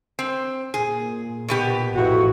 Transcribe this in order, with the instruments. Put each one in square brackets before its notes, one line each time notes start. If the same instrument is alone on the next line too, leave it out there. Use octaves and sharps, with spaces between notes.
[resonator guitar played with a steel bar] C4
[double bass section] A#2 [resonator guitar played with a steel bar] G#4
[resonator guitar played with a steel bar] B2 B3 G4
[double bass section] A1 [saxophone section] F2 E3 F#4